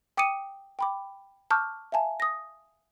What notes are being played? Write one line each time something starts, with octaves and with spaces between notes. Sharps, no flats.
G5 D6 D#6 C#7 D#7
G5 B5 D6
A5 C#6 D6 E6 F6 G6
E5 F5 G#5 A5
D#6 A#6